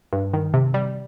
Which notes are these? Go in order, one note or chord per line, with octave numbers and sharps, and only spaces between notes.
G2
D#3
C3
G3